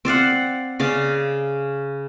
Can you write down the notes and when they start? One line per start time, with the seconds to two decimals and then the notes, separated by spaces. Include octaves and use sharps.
0.05 C4 D5 F5 F#5
0.80 C#3 D5 F5